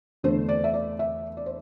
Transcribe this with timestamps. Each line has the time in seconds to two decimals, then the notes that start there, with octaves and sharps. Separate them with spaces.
0.23 E2 D3 A3 D4 C5
0.49 D5
0.64 E5
0.74 D5
0.99 E5
1.37 D5
1.46 C5